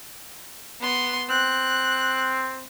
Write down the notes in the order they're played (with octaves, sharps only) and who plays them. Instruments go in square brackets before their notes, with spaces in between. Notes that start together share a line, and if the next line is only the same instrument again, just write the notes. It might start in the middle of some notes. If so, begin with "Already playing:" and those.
[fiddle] B3 C6
[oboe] C4 [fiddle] F#6